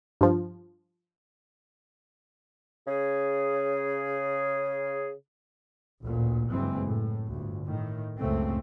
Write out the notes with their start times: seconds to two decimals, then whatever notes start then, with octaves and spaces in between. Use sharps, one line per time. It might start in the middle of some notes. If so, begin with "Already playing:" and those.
0.21 G2 F3
2.87 C#3 G#4
6.02 A1 D2 A#2
6.50 F#1 G2 E3 G#3 C4
6.87 A2
7.33 G1 D2
7.67 A2 D#3
8.19 C#2 F#2 A2 C#3 A3 C4